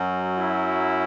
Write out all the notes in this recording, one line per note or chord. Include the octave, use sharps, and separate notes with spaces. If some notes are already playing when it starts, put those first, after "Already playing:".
Already playing: F#2 F#3
E4